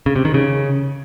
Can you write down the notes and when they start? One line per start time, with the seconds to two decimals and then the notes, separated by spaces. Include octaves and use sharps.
0.06 C#3
0.16 C3
0.25 D#3
0.34 C#3